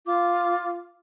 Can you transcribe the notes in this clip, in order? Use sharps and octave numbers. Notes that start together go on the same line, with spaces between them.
F4 D6